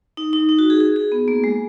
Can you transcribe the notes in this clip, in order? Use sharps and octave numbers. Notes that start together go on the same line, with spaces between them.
D#4
D#4
D#4
F#4
G#4
G#4
G#4
B3
A#3
G#3